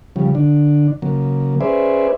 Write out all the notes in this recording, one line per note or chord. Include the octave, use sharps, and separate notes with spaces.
C#3 F3 G3
D3 D4
C#3 F#3 A#3
C#4 G#4 B4 C5 D5 E5